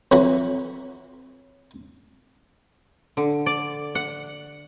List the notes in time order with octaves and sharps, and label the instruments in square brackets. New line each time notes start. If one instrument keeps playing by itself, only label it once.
[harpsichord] F2 E3 F#3 F#5 B5 C#6
[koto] D3
D5
F#5